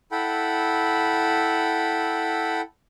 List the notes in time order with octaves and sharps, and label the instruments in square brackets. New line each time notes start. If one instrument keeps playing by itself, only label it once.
[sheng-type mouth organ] E4 A4 F#5 G5 B5